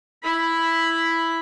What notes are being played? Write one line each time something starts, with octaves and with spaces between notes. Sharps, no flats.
E4 B5